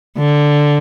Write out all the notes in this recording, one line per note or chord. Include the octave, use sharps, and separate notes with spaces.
D3